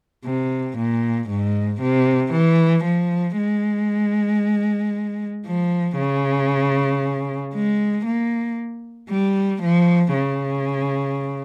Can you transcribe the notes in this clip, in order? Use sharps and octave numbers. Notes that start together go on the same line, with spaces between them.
C3
A#2
G#2
C3
E3
F3
G#3
F3
C#3
G#3
A#3
G3
F3
C#3